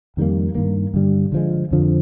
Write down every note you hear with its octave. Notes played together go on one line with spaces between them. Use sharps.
F2 D#3 G3 A#3
G2 D#3 A#3
G2 D3 G3
D3 F3 G#3
F2 D3 F3